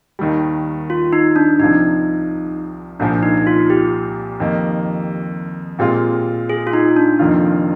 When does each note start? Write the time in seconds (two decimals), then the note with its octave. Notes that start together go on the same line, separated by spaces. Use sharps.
0.19 D#2 D#3 G3
0.90 F4
1.13 D#4
1.36 D4
1.59 C2 C3 F3 D#4
3.00 C2 A#2 F3 D4
3.23 D#4
3.37 D#4
3.47 F4
3.70 G4
4.40 F2 D#3 A#3 D#4
5.79 A#2 G#3 C4 F4 G4
6.49 G#4
6.67 F4
6.73 D#4
6.96 D4
7.19 F1 F2 D#3 A#3 F4